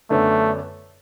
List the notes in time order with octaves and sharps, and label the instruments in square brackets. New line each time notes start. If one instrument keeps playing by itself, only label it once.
[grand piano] F#2 D3 B3 D4 [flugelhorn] A3